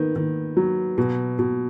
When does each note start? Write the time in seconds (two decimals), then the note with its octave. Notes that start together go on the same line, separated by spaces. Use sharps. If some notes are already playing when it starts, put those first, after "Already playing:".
Already playing: D#3 B3
0.16 D#3
0.57 F#3
0.98 B2
1.39 B2